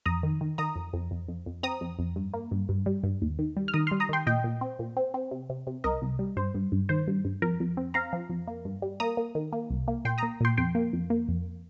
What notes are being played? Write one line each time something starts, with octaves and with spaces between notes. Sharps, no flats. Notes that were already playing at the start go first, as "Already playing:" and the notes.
F2 A#5 D#6
D#3
D#3
D#3 A#5 D#6
F2
F2
F2
F2
F2
C4 A#5 D#6
F2
F2
G2
A#3
G2
G2
G3
G2
D#2
D#3
G3
F6
D#3 A#5 D#6
C6 F6
G3
A#5 D#6
D#3 G5 C6
A#2 D#5 G5
A#2
C4
A#2
C4
C4
C3
C3
C3
C2 A#4 D#5
C2
G3
G2 C5
G2
G2
D#3 C5
G2
G2
F2 A#4
F2
C4
C4 F5 A#5
F3
F2
A#3
G2
G3
A#3 A#5 D#6
A#3
D#3
A#3
C2
A#3
A#2 G5 C6
A#5 D#6
A#3
A#2 G5 C6
F2 G5 C6
A#3
F2
A#3
F2